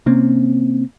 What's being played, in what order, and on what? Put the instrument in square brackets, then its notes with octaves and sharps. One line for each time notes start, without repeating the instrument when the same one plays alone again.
[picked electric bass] C3 A#3 C4 C#4